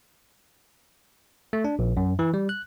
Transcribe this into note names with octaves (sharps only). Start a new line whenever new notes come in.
A3
D4
A#1
F#2
E3
G3
F#6